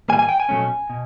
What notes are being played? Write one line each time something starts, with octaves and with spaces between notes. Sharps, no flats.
A2 E3 G3 A#3 G#5
G#5
G5
G#5
B2 F#3 A3 C#4
B2